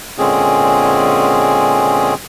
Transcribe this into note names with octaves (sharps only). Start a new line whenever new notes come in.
A#2 D3 G#3 C4 C#4 G#4